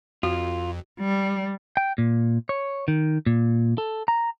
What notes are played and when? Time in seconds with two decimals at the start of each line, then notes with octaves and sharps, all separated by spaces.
0.23 F2 F4 F#4
1.00 G3
1.77 G5
1.98 A#2
2.49 C#5
2.88 D#3
3.26 A#2
3.78 A4
4.08 A#5